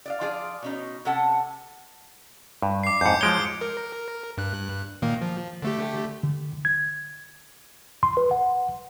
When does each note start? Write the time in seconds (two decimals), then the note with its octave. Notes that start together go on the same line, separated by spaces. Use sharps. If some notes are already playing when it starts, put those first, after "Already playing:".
0.06 D5 D#5 F5
0.21 F3 F4 G#4 D5
0.62 B2 C#4 D#4
1.05 C3 C#4 A4 F#5 A5
2.62 G2
2.83 D6 C7
3.01 F2 G#2 G6 C#7
3.21 F3 G#3 C#5 D7 G7
3.61 A#4
4.38 G2 F#6
5.02 A#2 D#3 A#3
5.22 F3
5.62 D3 A3 G4
6.23 D3
6.65 G#6
8.03 C6
8.17 B4
8.31 F#5